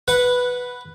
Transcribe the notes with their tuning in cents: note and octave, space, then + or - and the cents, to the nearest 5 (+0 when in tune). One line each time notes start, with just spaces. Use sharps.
B4 +0 F#5 -10